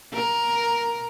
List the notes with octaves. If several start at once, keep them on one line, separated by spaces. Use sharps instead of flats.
A#4